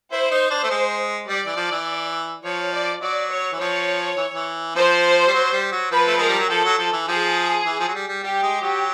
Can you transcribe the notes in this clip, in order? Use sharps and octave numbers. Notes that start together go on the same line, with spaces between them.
E4 C5
D#4
D4
A3
G#3
G3 D5
E3
F3
E3
F3 C#5
D5
F#3 D5
C#5
E3
F3 C#5
E3
E3
F3 C5
G3
F#3
G3
F#3
F3 B4
A3
G#3 A#4
G3
F#3
F3 A4
F#3
F3
E3
F3 G#4
E3
F3
F#3
G3
G3
G3 G4
G#3
F#3